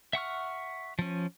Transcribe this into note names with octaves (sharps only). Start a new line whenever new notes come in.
E5 F#5 C#6 F6
F3 C#4